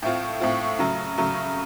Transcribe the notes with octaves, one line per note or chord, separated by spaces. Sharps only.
A2 A3 C4 F4
A2 A3 C4 F4
C#3 F#3 A3
C#3 F#3 A3